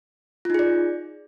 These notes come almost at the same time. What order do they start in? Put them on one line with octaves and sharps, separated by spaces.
F4 D#4 G#4 D5